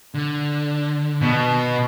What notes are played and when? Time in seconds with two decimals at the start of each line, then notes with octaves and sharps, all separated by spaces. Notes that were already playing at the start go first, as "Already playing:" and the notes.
0.14 D3
1.21 B2